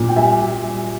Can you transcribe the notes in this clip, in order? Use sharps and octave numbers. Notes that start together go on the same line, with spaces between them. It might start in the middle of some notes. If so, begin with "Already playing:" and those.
Already playing: A#2
G5
G3 E5 G#5
G3